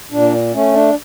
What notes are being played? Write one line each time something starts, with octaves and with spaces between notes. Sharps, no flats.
A#2 D4
A3 C#4
D4